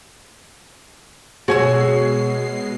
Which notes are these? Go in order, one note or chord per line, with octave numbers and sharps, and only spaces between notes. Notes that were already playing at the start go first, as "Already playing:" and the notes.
B2 G#3 F#4 G#4 C#5 G#5 E6 C7